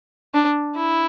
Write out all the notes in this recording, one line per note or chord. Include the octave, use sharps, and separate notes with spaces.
D4
E4